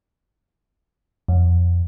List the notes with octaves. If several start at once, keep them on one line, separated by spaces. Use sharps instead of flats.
F2